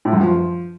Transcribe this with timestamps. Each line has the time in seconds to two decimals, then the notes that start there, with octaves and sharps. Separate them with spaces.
0.05 A2
0.13 F#2
0.21 F3